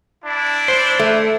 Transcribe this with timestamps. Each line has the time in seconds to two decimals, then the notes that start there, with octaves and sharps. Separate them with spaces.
0.25 D4 E4
0.68 C5
0.99 A3